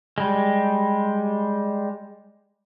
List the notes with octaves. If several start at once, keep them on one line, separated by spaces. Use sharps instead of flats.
G3 G#3